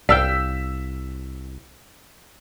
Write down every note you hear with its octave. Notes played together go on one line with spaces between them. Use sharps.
C2 D5 F5 G5 E6 B6